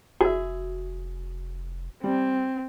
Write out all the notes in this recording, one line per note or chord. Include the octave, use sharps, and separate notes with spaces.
F1 F#4 G#4 E5
G3 C4